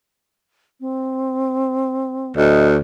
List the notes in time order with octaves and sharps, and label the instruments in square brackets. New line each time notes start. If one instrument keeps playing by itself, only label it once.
[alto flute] C4
[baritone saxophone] D2 [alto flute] D#5